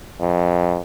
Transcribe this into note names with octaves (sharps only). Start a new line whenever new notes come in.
F2